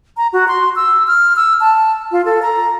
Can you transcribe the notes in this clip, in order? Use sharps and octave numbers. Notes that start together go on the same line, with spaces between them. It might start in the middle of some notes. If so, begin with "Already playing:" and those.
A#5
F#4
C6
E6
F6
E6
A5
F4
A4
A#5